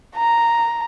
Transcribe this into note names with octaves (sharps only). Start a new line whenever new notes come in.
A#5